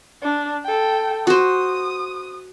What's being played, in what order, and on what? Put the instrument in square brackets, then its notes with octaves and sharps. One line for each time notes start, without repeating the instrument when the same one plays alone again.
[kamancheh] D4
A4 G5
[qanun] F#4 C5 [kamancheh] D#6